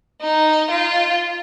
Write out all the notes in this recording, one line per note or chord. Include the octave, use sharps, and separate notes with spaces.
D#4
F4